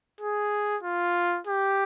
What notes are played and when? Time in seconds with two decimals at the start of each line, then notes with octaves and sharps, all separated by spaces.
0.21 G#4
0.83 F4
1.47 G4